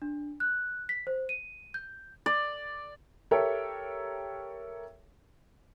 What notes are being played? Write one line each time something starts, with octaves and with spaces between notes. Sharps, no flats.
D4
F#6
B6
C5
D#7
G6
D5
G4 A4 A#4 C#5 E5 G5